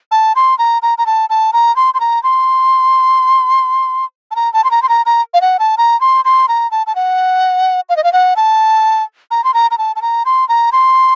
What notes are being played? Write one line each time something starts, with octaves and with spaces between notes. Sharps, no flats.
A5
C6
A#5
A#5
A#5
A5
A5
A#5
C6
C6
A#5
C6
A5
A#5
A5
C6
A#5
C6
A#5
A#5
F5
F#5
A5
A#5
C6
C6
A#5
A5
A5
F#5
F5
D#5
F5
F#5
A5
A#5
C6
A#5
A#5
A5
A5
A#5
C6
A#5
C6